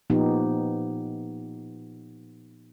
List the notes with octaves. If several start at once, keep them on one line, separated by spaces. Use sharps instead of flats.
A#2 F3 B3 D#4 G4